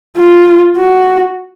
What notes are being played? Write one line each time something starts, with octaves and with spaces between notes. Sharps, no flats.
F4
F#4